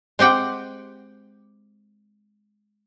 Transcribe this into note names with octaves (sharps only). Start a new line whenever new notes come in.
G#3 C4 G4 F#5 G5